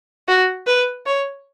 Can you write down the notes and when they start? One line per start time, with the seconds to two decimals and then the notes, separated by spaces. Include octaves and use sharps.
0.28 F#4
0.66 B4
1.06 C#5